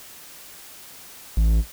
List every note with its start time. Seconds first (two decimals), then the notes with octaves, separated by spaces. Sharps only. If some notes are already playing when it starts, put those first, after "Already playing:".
1.37 A1